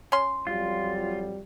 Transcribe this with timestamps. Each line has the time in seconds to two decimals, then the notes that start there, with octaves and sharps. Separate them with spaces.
0.12 C#4 C6
0.47 F2 F#3 G3 F4